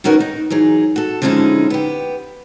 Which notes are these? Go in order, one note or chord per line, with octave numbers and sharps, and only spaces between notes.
D#3 C#4 D#4 F#4 A#4 B4
D#4
E3 F#3 D#4 G#4
F#4 A4
D3 F3 G#3 C#4 D#4 E4
B3 G4